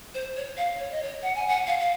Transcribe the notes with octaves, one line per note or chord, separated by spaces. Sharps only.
C5
C#5
F5
C#5
D#5
C#5
F#5
G#5
F#5
F5
F5